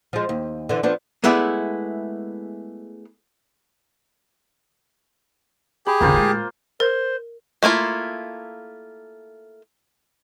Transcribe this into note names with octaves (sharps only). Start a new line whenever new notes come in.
F3 G#3
D#2
D3 E3
F3 B3 D4
G#3 A3 B3 E4 G#4 D5
G4 G#4 B5
E2 C#3 A#3 F4 C5
A2 G#3
A#4 C5
A3 A#3 E4 F4